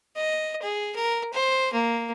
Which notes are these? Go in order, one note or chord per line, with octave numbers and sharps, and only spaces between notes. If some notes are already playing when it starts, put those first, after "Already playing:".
D#5
G#4
A#4
C5
A#3